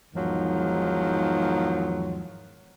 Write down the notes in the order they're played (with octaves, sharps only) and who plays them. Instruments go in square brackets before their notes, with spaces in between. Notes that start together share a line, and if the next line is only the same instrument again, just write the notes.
[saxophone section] E2 G#2 D#3 F3 F#3